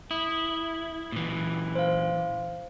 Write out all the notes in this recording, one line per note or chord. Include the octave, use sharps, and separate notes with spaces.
E4 D#6
A#2 E3
C5 F5